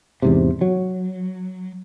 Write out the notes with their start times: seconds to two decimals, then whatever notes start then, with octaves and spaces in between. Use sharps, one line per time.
0.22 E2 G#2 C3
0.61 F#3